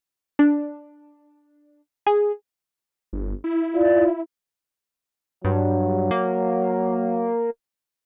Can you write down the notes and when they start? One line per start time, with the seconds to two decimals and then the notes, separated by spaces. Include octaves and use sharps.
0.39 D4
2.07 G#4
3.13 G1
3.44 E4
3.75 F4 D5
5.45 G2 F#3
6.11 A#3